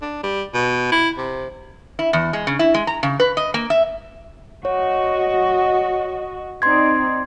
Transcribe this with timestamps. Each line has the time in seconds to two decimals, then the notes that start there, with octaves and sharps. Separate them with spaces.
0.02 D4
0.23 G3
0.54 B2
0.92 E4
1.17 C3
1.99 E4
2.13 E2
2.33 G#3
2.47 C#3
2.59 E4
2.74 G#3
2.87 A#5
3.03 C#3
3.20 B4
3.37 D#5
3.54 A#3
3.70 E5
4.65 F#4 C#5 D#5
6.62 C4 D#4 D5 C6 G#6